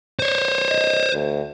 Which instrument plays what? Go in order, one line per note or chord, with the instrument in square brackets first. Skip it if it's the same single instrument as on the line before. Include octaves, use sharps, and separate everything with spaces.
[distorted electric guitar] C5 C#5
[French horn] D#5
D2